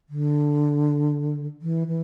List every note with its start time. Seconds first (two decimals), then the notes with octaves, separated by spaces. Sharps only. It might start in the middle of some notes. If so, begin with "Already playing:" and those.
0.09 D3
1.62 E3
1.87 E3